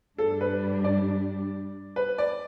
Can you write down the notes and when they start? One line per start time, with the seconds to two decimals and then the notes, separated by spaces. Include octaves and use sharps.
0.18 G2 G3 D4 A4
0.41 B4
0.84 D5
1.96 B4
2.18 D5